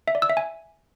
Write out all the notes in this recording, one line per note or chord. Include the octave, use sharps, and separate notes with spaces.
E5
D5
E6
E5
G#5